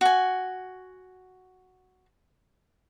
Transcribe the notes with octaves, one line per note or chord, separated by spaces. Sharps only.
F#4 G#5